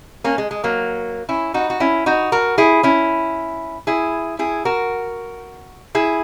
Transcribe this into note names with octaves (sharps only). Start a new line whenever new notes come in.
A#3 C#4
G#3
G#3
F#3 A#3
C#4 E4
D#4 F#4
F#4
C#4 E4
D#4 F#4
F#4 A#4
E4 G#4
C#4 E4
E4 G#4
E4 G#4
F#4 A#4
E4 G#4